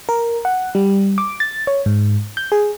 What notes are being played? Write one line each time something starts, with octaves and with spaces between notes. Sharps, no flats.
A#4
F#5
G3
D6
A6
C#5
G#2
G6
G#4